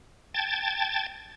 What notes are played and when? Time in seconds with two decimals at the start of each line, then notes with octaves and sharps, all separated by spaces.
0.34 G5 A5 G#6 A6